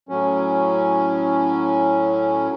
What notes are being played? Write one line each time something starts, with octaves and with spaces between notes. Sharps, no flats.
A2 F#3 C#4